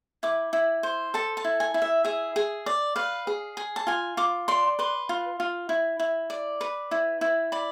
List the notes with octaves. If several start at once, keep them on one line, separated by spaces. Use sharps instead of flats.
E4 D6
E4
C5
A4 A5
A5
E4
G#5
E4
E5
G#4 E5
G#4
D5
B4 F5
G#4
G#4
A5
F4 G#5
F4 D6
D5 C6
B4 C6
F4
F4
E4
E4
D5
B4
E4
E4
D5 B5